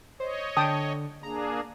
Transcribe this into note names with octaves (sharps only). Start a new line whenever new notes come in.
C5 C#5 D#5
D3 G5 A5 D#6
A#3 D4 G#4 A#5